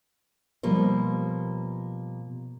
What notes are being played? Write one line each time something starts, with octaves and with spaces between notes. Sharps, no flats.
B2 F3 G3 A#3 C5